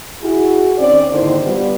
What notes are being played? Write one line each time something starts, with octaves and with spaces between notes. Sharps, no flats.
E4 F#4 G#4
D#3 C4 C#4 D5
D#2 G#2 D3 D#3 E4 C5
G3 B3 F4